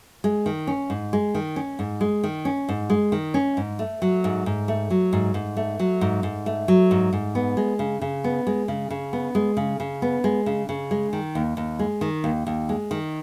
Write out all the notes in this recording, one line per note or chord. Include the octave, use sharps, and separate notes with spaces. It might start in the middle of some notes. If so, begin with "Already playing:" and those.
G#3
D#3
C#4
G#2
G#3
D#3
C#4
G#2
G#3
D#3
C#4
G#2
G#3
D#3
C#4
G#2
A3
F#3
G#2
G#2
A3
F#3
G#2
G#2
A3
F#3
G#2
G#2
A3
F#3
G#2
G#2
B3
G#3
C#3
C#3
B3
G#3
C#3
C#3
B3
G#3
C#3
C#3
B3
G#3
C#3
C#3
G#3
D#3
D#2
D#2
G#3
D#3
D#2
D#2
G#3
D#3